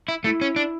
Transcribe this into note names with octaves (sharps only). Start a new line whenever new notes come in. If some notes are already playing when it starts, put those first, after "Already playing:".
E4
A3 E4
C#4
D4